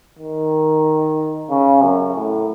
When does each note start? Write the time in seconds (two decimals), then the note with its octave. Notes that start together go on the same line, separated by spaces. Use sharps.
0.19 D#3
1.50 C#3
1.82 F#2
2.15 A2